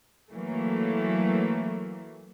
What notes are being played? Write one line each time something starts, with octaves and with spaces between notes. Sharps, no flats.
E3 F#3 A3 A#3